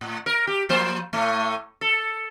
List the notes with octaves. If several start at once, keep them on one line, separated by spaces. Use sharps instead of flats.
A2
A#4
G4
F3 A#3 C5
A2 A3
A4